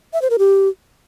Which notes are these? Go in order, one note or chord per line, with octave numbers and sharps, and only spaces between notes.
E5
C5
A#4
G4